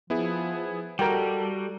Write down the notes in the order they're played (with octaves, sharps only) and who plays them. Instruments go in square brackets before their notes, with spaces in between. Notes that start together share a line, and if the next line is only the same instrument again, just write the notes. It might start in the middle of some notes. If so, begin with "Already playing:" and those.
[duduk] F3 [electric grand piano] B3 E4 G#4
[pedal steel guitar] G3 [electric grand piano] F#4 [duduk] A4 [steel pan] A#4 G5